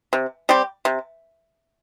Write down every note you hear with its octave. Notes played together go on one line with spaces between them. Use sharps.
C3
G3 C4 G4
C3